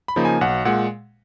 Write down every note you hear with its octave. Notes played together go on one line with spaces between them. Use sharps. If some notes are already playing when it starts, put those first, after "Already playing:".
B5
C#3 F3 A#3 D#4
G#5
B1 F#5
A#2 G#3 F#5